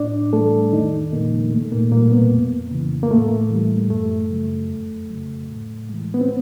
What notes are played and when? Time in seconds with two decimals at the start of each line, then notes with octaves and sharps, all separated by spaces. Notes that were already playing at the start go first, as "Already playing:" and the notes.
Already playing: A2 D4 D5
0.33 E3 G3 A3 A4
0.72 F2 D#3 D#4
1.12 A#2 C#3 F3 G#3 A#3
1.52 G#2 A3
1.72 A#2 A#3
1.92 A#2 E3 G3 A#3
2.12 B2 B3
2.32 F2
2.71 C#3 E3
3.03 A#3
3.11 A2 A3
3.50 E3 G3
3.90 F#2 A3
4.30 C#3 F#3
4.69 F2
5.10 C#3 F#3
5.49 A2
5.89 E3 G#3
6.14 B3
6.21 C4